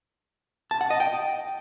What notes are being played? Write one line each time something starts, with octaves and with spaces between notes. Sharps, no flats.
A5
F#5
D#5
G5